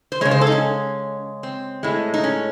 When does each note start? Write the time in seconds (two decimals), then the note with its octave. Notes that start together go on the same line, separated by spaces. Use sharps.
0.12 C5
0.21 G#3 C#5
0.25 C#3
0.31 C5
0.41 A4
0.47 D#4
0.52 C#4
1.43 C4
1.83 A2 G#3
2.14 D#4
2.24 C#4